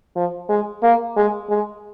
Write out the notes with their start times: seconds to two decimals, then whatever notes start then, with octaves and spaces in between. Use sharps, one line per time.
0.16 F3
0.49 G#3
0.83 A#3
1.16 G#3
1.50 G#3